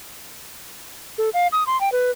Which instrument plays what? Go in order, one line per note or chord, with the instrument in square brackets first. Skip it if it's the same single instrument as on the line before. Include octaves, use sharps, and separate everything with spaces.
[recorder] A4
F5
D#6
C6
G5
B4